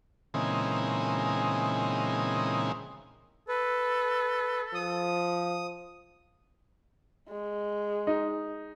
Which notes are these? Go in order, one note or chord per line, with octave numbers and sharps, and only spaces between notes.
A#2 C#3 E3 G#3 C4 D#4
A4 B4
F3 D#6
G#3
D#4